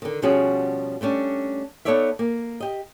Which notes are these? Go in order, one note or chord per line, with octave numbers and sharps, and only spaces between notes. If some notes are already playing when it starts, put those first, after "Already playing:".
D3 D#3
B2 F3 G3 C#4 F#4 G#4
G3 A3 C#4 D4
B3 D#4 A4 C#5 D5 E5
A#3
G4 D#5